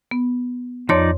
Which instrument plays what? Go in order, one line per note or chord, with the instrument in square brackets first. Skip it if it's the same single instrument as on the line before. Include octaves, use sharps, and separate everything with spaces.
[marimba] B3
[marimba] F2 C#5 C6 [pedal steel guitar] F3 D#4 D5